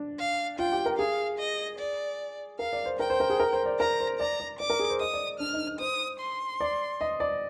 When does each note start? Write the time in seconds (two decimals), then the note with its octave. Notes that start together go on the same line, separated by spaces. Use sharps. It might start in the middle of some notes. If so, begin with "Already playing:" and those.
Already playing: D4
0.19 F5
0.59 F4 G5
0.72 G4
0.86 A#4
0.99 G#4 F5
1.39 D#5
1.79 D5
2.59 A#4 F5
2.73 D5
2.86 C5
2.99 A#4 G5
3.10 C5
3.20 A#4
3.30 G#4
3.40 A#4
3.53 C5
3.66 D5
3.80 A#4 A#5
4.00 C5
4.19 D5 A#5
4.40 D5
4.59 D5 D6
4.70 A#4
4.79 G#4
4.90 C5
5.00 D#5 D#6
5.13 D5
5.40 D4 F6
5.53 D#4
5.67 D#4
5.80 C5 D#6
6.20 C6
6.61 D5
7.01 D#5
7.20 D5